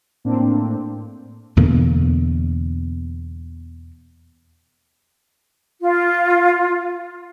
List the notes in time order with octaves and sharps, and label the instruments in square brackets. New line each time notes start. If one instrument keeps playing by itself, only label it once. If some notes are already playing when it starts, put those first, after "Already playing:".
[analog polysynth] A2 A#3 C4 D4
[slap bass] E2 B2 D3 A#3
[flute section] F4